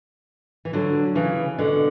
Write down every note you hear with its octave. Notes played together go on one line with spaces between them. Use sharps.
E3
D3 F#3
C#3 E3
B2 D3